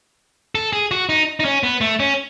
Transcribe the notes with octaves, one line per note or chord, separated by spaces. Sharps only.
A4
G#4
F#4
D#4
D#4
C#4
B3
A3
C#4